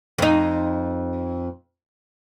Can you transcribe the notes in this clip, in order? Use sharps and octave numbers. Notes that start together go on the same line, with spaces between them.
F2 D#4